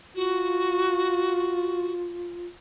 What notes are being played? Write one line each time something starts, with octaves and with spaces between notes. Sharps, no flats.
F4 F#4